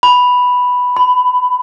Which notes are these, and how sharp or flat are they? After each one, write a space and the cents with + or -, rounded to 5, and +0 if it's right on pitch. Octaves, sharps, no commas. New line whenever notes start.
B5 +0
B5 +20